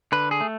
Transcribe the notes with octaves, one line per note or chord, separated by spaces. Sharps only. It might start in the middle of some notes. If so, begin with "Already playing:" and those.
D3 B4
G#4
A3